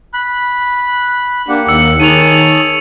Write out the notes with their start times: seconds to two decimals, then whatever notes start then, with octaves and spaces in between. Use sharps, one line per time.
0.14 B5 F#6
1.48 A#3 D4 G4 F#5
1.68 D#2 E6 C#7
2.00 D#3 G#4 C#5 A5 D#7 F7